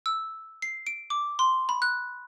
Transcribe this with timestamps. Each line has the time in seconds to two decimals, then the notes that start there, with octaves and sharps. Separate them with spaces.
0.06 E6
0.62 C7
0.87 D7
1.10 D6
1.39 C6
1.69 B5
1.82 F#6